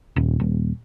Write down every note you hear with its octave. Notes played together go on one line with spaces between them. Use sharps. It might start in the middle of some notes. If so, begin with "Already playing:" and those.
D#1
D#1